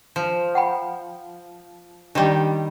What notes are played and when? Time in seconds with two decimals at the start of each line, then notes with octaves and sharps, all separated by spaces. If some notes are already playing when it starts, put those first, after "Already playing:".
0.16 F3
0.55 F#5 G5 B5
2.15 D#3 G3 D4 G4 G5